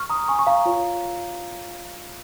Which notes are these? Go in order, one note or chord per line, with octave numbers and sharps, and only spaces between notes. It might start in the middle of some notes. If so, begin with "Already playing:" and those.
Already playing: C#6 F6
A#5 D#6
G#5 C#6
C#6
F5 A#5
F4 C#5